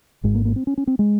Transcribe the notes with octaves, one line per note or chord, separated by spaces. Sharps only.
G#1 G#2 G#3
A#3
A#3
C4
C#4
C#4
C4
G#3